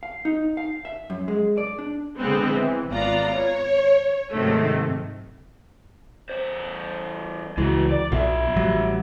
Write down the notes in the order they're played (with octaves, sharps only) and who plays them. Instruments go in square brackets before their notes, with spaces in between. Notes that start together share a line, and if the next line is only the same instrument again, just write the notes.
[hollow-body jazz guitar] F5
D#4
F5
E5
F#2
G#3
D5
D4
[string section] D3 G#3 B3 C4
E3
G#1 B3 F4 D5 A#5
C#5
G#2 C3 D#3 F#3 A3
[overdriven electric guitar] E2 C5
[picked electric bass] C#2 E3 [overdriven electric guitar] G#3 F#4
[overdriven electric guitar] D5
[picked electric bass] B1 B2 [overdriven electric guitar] F4 E5
[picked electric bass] A1 F#3 G3